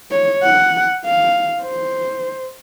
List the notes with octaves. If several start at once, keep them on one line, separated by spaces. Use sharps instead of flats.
C#5
F#5
F5
C5